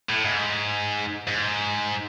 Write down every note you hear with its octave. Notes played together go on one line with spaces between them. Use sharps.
A2
G#2
G#2